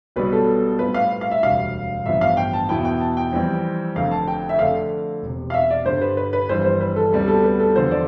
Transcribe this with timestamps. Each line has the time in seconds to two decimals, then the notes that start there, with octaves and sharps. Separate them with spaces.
0.16 B1 B2 G3 B3 B4
0.32 A4
0.79 A2 G3 C4 F4 B4
0.94 F5
1.21 F5
1.31 E5
1.42 E1 D2 C3 G3 F5
2.06 A1 G2 F3 B3 E5
2.21 F5
2.37 G5
2.53 A5
2.69 E2 B2 B3 E4 G5
2.85 G5
3.00 A5
3.17 G5
3.32 F2 E3 G3 C4
3.96 F1 F2 D3 F5
4.11 A5
4.28 G5
4.49 E5
4.59 F2 D3 A3 D4 F5
5.22 E1 E2 C3
5.50 F5
5.54 E5
5.70 D5
5.85 G2 D3 G3 C5
6.01 B4
6.17 B4
6.33 B4
6.49 G1 F2 E3 G3 C4 C5
6.64 C5
6.80 B4
6.96 A4
7.13 D2 C3 G3 B3
7.28 A4
7.44 B4
7.60 A4
7.76 E2 D3 F3 C5
7.91 D5